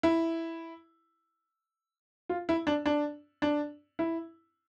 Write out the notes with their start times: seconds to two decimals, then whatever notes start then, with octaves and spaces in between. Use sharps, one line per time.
0.03 E4
2.29 F4
2.49 E4
2.67 D4
2.86 D4
3.42 D4
3.99 E4